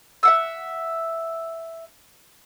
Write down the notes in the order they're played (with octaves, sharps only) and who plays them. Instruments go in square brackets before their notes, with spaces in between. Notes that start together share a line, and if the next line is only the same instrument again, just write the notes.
[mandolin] E5 F#5 E6